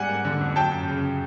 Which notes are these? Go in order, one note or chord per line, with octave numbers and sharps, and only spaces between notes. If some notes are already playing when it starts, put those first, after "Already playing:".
Already playing: G#2 G3 F#5 G#5
A#3
D3
F2
F#3 G5 A5
F#2
C#3